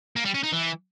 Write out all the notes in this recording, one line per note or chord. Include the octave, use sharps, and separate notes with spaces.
A#3
G3
C#4
D#4
E3